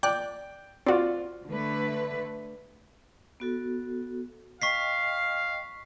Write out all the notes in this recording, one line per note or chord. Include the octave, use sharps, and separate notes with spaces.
D5 G5 D6 F#6
C4 F4 F#4 D5
D3 A3 B4
B3 F#4 A4
D#5 F5 G5 C#6 B6 C7